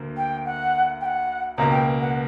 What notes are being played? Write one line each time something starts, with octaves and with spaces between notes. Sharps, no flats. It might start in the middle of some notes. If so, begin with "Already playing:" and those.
Already playing: D2 D3 A#3
G5
F#5
G5
F#5
C#2 B2 A#3 A#5
G5
F#5